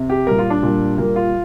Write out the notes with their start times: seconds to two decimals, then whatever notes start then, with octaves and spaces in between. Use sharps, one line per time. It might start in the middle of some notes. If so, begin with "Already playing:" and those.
Already playing: C3
0.10 G4
0.27 A#2 G3 A#4
0.39 F4
0.50 D4
0.63 A#2 G3
0.98 A#2 G3 A#3
1.16 F4